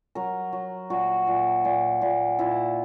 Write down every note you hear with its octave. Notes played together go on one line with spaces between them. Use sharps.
F#3 A#4
F#3
A#2 F#4
A#2
A#2
A#2
A#2 E4